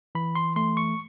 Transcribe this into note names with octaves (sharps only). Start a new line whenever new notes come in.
E3 B5
C6
A3 C6
C#6